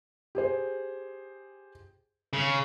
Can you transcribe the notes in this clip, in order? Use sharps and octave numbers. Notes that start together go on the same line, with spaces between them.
G4 G#4 C5
C#3